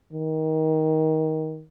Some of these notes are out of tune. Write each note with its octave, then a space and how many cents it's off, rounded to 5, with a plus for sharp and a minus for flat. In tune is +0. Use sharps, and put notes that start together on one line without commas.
D#3 +20